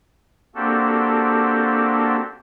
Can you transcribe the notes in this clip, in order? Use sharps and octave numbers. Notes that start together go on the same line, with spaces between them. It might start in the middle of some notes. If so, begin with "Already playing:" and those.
A#3 C4 D4 F#4 G4 A4